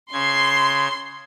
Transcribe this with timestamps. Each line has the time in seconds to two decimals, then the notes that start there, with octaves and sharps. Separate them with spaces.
0.13 C#3 C6 G#6